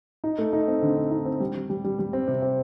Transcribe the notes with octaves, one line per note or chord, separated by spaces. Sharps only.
D#4
A3
D#4
C4
D3
C4
D#4
C4
G3
G3
G3
G3
G3
C4
C3
C4